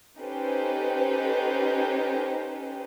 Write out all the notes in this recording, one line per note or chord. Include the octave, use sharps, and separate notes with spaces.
C#4 D#4 G4 A4 B4 C5